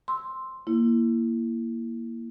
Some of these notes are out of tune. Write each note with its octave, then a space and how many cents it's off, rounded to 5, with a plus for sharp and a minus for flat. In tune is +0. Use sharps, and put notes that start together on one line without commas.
C6 +0 E6 -5
A#3 +0 E4 +15